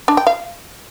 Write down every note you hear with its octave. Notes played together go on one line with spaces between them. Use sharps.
D4
G5
F5